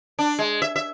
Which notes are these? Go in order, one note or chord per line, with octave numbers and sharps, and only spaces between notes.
D4
G#3
E5
E5